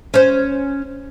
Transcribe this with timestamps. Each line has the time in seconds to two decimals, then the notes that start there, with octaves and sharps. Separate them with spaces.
0.14 C#4 C5